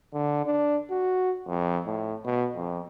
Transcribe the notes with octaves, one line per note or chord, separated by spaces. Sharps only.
D3
D4
F#4
F2
A2
B2
F2